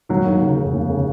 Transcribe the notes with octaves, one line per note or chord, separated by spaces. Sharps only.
D#2 D#3 F#3
D#2
C#3
F1
D#2
C#3